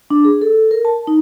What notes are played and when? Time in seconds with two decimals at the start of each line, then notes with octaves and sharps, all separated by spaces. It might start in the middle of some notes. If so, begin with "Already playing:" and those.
0.10 D4
0.25 G#4
0.42 A4
0.71 A#4
0.85 A5
1.07 D#4